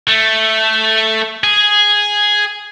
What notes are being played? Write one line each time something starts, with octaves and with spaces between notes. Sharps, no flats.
A3
G#4